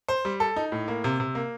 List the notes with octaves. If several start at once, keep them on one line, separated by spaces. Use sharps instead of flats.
C5
G3
A4
D#4
A2
A#3
C3
C3
A#3